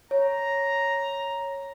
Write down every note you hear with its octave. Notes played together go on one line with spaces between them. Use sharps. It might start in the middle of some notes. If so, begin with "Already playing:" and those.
C#5 A#5